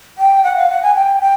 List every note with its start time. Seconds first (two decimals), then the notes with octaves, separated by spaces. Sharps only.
0.18 G5
0.44 F#5
0.56 F5
0.70 F#5
0.83 G#5
0.95 G5
1.21 G5